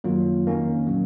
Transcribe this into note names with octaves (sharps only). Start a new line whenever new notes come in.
F#2 D#3 F#3 A#3 F4
F2 D#3 A#3 C#4
A#2 F#3